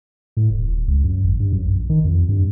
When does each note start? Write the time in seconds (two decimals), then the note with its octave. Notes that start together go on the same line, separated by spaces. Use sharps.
0.37 A2
0.50 D#1
0.68 D#1
0.87 C#2
1.04 F#2
1.23 G#1
1.40 G2
1.52 F#2
1.65 A#1
1.89 D#3
2.04 F2
2.29 G2